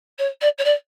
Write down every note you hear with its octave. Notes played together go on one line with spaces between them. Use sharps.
C#5
D5
C#5
D5